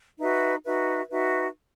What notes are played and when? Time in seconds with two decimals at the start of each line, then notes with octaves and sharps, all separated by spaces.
0.18 D#4 F#4 B4 E5
0.64 D#4 F#4 B4 E5
1.10 D#4 F#4 B4 E5